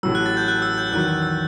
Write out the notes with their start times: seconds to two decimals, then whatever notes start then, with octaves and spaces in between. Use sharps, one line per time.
0.03 A1 A2 F#3 E6
0.15 F#6
0.26 A6
0.37 G6
0.48 F#6
0.62 E6
0.78 G6
0.92 E2 D#3 F#3 F#6
1.08 F#6
1.22 E6